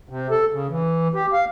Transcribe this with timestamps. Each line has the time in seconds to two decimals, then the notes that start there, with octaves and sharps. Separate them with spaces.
0.09 C3
0.31 A4
0.52 C#3
0.69 E3
1.14 G4
1.33 F5